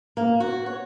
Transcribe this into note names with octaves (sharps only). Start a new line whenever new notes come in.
A#3
F#4
C#5